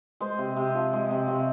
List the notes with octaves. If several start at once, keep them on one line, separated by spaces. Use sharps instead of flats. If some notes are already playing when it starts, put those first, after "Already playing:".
G#3 C5
C3
C3
F3
G#3
C3
C3 C#5